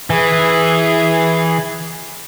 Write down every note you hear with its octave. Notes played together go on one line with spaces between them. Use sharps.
E3 G#4